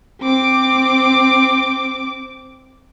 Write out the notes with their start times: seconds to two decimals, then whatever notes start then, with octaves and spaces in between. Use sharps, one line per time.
0.21 C4 D6